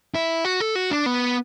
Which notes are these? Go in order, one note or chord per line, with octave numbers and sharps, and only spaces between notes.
E4
F#4
A4
F#4
D4
B3